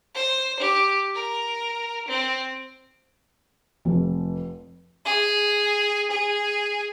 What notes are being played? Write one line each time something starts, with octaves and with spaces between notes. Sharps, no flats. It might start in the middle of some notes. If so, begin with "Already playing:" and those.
C5
G4
A#4
C4
F1 F2
G#4
G#4